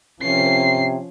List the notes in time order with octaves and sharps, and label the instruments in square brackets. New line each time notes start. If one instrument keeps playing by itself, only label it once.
[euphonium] C3 [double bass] F3 C#4 [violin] C7